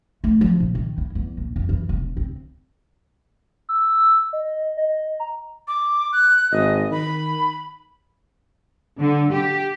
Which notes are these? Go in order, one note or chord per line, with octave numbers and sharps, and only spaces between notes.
A3
F3
A#2
D#3
E4
E2
A#1
F2
E3
E1
C4
E6
D#5
D#5
A#5
D6
F#6
G#1 D#5
D#3 B5
D3
G4